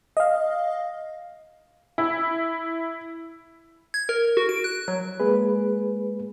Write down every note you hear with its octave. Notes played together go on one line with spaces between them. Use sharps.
D#5 F5
E4
G#6
A#4
F#4
D7
F#6
F#3
G#3 A#3 G#4 B4